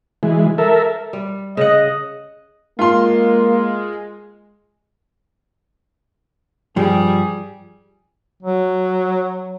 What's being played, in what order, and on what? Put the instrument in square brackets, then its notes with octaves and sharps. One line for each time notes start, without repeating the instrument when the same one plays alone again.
[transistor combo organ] E3 G#3
A4 A#4 E5
[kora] G3
[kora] C#3 F#5 [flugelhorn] D#5
[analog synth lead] G#3 [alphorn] A#3 [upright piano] F4 C6
[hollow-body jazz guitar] G2 F3 [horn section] G3 G#4
[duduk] F#3